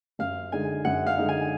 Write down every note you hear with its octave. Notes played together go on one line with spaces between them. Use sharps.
F#2 F5
D3 G#3 D#4 G#5
F#2 F#5
F5
D3 G#3 D#4
G#5